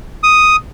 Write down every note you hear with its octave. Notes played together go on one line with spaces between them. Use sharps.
D#6